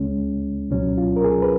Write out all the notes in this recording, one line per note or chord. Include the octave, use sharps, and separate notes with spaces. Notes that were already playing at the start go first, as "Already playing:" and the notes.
Already playing: C#2 C#3 G#3 C#4
C#2 B2 F#3 C#4
F4
A#4
G#4
B4